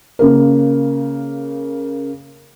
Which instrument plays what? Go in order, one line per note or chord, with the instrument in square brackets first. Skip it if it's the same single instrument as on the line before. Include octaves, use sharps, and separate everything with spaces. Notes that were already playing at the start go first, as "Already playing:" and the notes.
[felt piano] C#3 A#3 A#4